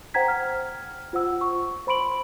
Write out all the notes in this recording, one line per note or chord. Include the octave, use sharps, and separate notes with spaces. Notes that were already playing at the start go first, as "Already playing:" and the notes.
C5 F#5 G5 A#5 G#6 B6
G5 F6
F4 C5 F#5 E6
C#6
C5 B5 C6 D7 F#7